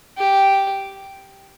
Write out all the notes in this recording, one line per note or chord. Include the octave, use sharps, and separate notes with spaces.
G4